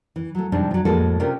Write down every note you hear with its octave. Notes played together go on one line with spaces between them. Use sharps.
E3
F#3 A3
G#2 C3 F3 G3 D4
F3 F#3
F2 A2 G#3 A#3 F#4 A4
C3 C#4 D4 F4 G4 A#4